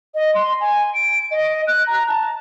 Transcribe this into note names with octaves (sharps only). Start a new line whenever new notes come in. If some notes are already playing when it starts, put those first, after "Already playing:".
D#5
C6
G#5
D7
D#5
F#6
A#5
A5